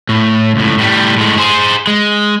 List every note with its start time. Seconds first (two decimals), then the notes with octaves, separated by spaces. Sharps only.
0.09 A2
0.56 C#2 A2
0.78 A2 G3
1.17 A2 G#3
1.38 G#4 C5
1.87 G#3